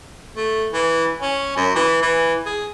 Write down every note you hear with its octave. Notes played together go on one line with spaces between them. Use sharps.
A3
E3
C#4
F#2
E3
E3
G#4